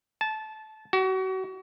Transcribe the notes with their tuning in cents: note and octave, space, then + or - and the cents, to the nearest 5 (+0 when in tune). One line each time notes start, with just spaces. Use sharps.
A5 -20
F#4 +35